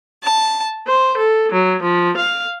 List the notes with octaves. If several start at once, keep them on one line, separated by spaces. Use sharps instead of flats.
A5
C5
A4
F#3
F3
F5